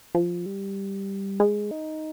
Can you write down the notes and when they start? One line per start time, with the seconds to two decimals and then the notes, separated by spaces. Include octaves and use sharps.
0.15 F3
0.46 G3
1.40 G#3
1.71 D#4